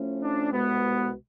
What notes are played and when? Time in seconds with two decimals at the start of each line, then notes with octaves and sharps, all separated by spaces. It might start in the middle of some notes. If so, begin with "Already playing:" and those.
Already playing: A2 F3 A3 C#4
0.22 D4
0.52 C2 B2 G#3 B3